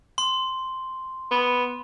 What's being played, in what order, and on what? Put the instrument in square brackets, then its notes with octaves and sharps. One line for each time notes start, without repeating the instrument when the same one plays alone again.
[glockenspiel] C6
[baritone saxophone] B3